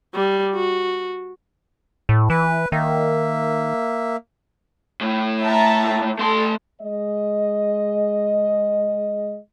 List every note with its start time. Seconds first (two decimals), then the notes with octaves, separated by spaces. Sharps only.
0.15 G3
0.55 F#4
2.09 A2
2.30 E3 B4
2.72 D#3 A#3 E5
5.01 A2 A3
5.43 E5 A5 A#5
6.19 A3 A4 C6
6.81 G#3 D#5